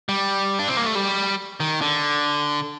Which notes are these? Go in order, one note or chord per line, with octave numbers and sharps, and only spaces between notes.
G3
D4
C4
A#3
A3
G3
D#3
D3